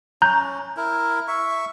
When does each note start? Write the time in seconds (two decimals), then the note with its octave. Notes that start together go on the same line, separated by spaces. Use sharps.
0.22 C#4 A#5 F#6 G6
0.77 E4 A#4
1.28 E5 C#6